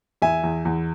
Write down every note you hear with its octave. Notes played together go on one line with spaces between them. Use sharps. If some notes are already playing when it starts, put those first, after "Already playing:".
E2 E5 G#5
E2
E2